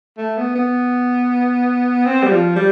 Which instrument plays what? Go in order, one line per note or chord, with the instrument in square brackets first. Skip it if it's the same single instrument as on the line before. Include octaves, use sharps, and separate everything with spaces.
[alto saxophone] A3
B3
B3
C4
G3
F3
G3